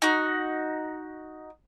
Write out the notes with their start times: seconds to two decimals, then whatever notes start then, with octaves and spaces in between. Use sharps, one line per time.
0.02 D#4 F#4